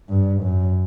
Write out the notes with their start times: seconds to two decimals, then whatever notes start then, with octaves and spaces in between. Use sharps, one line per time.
0.09 G2
0.42 F#2